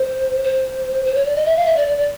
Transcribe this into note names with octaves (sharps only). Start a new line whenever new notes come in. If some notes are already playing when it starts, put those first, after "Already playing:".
Already playing: C5
C5
C5
C#5
D5
D#5
E5
F5
E5
D5
D5
D5